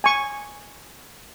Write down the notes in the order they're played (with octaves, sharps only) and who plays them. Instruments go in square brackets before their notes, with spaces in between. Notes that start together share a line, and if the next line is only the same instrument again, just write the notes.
[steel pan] G#5 C#6